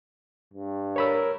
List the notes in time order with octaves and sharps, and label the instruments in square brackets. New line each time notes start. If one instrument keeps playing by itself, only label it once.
[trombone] G2
[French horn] A#4 [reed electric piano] C#5 B5 E6